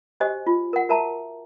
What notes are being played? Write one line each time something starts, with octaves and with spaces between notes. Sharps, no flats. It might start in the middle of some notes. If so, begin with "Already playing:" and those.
F#4 G4 C5 D#5 G#5
F4
A#4 F#5
F#4 A#4 E5 A5 A#5